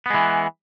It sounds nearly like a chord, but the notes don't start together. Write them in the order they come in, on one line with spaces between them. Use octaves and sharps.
B3 G#3 E3